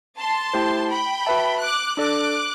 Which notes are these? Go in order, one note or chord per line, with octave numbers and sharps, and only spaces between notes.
A5 C6
A3 E4 G4 C5 G5
G5 B5
F#4 B4 E5 A5
D6 F#6
D4 A4 D5 D6 F#6